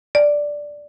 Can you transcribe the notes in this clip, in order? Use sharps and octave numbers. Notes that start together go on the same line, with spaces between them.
D5